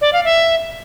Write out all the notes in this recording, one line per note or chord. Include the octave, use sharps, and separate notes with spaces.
D5
F5
E5